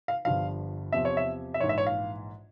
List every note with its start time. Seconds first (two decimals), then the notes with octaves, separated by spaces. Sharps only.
0.08 F5
0.25 G1 G2 F3 F5
0.92 E2 C3 F3 E5
1.05 C#5
1.17 E5
1.54 E5
1.60 A#1 G#2 E3 C#5
1.69 E5
1.78 C#5
1.87 F5